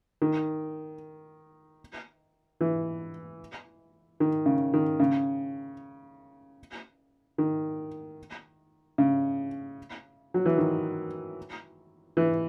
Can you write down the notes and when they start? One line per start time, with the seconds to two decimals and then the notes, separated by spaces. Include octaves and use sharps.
0.22 D#3
2.61 E3
4.20 D#3
4.46 C#3
4.74 D#3
5.00 C#3
7.38 D#3
8.98 C#3
10.34 F#3
10.46 E3
10.58 D#3
12.17 E3